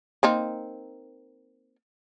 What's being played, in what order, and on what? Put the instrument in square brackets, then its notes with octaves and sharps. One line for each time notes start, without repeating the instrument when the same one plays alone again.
[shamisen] A#3 C4 D#4